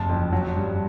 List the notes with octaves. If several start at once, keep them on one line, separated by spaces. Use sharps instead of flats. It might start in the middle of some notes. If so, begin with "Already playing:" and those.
Already playing: F#1 A5
F2
F#3
G2